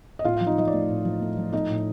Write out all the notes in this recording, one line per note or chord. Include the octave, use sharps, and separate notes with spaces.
D#5
A2 F4 F5
F3 F5
D#4 D#5
F3 D#5
D5
A3
A2
F3
A3
F3
A3 D#4 D#5
A2